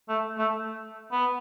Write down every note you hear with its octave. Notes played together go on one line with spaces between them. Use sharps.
A3
A3
B3